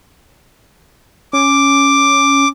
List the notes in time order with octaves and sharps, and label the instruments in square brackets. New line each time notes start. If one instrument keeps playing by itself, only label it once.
[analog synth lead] C#4 [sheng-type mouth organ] D6